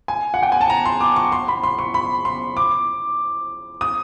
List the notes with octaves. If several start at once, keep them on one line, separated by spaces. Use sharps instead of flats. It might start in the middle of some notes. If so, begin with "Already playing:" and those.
G#5
F#5
G5
G#5
A5
A#5
C6
D6
C#6
C6
B5
C6
C#6
B5
C6
D6
D#6